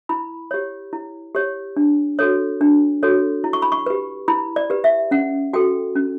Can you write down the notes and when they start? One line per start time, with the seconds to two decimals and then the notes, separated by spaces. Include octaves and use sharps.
0.09 E4 B5
0.51 G4 C#5
0.93 E4
1.35 G4 C#5
1.76 D4
2.19 F#4 A4 C#5
2.61 D4
3.03 F#4 A4 C#5
3.44 E4
3.53 C#6
3.62 B5
3.72 C#6
3.86 G4 B4
4.28 E4 B5
4.56 D5
4.70 G4 B4
4.84 E5
5.11 C#4 F#5
5.53 F#4 A4 G5
5.95 C#4